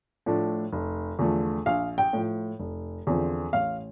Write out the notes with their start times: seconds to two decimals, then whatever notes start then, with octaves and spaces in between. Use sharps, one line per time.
0.26 A2 F3 A3 D4
0.73 F1
1.19 E2 D3 F3 A3
1.66 A#1 F5
1.98 G5
2.13 A2 F3
2.60 F1
3.07 E2 D3 F3 C4
3.53 A1 F5